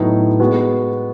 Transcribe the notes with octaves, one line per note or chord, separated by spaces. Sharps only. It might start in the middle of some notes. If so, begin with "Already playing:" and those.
Already playing: A2 F#3 B3 D#4
G#3 B3 F#4